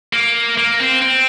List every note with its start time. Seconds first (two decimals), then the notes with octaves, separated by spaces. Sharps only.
0.13 A#3
0.57 A#3
0.80 C4
1.02 C4